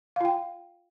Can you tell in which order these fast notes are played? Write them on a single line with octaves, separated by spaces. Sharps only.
F5 F4 G5